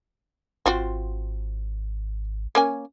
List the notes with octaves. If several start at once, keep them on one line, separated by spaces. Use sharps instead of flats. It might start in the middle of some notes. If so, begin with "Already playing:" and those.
G#1 C4 F4 F#4
A#3 C#4 G#5